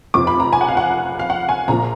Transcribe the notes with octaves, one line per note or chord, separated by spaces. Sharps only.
F1 F2 F3 D6
B5
A#5
G#5
F#5
F5
F#5
F5
F#5
G#5
A#1 A#2 F3 A#5